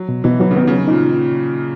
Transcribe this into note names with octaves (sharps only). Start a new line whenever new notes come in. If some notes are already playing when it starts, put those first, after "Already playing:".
Already playing: F#3
B2
B2 E3
E3 F#3
C#3
D#3 B3
C#3 F#3
A#2 D#4